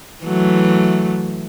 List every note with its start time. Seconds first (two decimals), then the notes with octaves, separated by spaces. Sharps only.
0.23 E3 F#3 A3